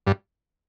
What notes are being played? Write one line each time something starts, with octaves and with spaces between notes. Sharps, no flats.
G2